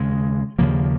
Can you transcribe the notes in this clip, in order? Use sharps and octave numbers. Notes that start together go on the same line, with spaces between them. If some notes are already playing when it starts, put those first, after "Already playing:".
Already playing: D#2 C#3 G#3
D#2 C#3 F3 A#3